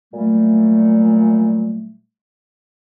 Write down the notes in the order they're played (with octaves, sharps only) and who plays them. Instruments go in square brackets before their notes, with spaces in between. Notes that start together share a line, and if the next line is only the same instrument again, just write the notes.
[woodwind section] A#2 F#3 G3 A3